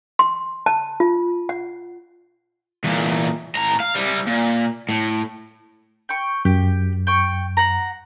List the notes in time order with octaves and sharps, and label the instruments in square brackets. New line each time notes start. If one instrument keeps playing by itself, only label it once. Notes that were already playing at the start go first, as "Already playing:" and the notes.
[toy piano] C6
A5
F4
F#5
[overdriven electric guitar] E2 A#2
A2 A#5
F5
G3 E4
A#2
A2
[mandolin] G5 C#6
[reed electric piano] F#2 [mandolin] G4
[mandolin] G5 C#6
F#5 A#5